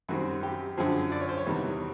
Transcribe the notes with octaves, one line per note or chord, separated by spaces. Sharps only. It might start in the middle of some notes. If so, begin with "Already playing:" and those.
F#2 D#3 G3 C4 F#4
G4
F#2 D3 F3 G#4
D5
C#5
C5
C#5
E2 C3 D#3 G3